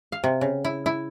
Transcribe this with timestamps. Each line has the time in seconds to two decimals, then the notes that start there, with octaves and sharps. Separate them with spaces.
0.12 F5
0.24 C3
0.41 C#3
0.65 E4
0.86 E4